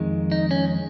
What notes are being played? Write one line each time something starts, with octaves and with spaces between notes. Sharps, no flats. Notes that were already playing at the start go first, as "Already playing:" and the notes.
Already playing: F2 D#3 G#3
D#4
C#4